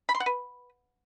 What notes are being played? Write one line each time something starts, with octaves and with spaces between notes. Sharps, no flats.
B5
C6
F#5
B4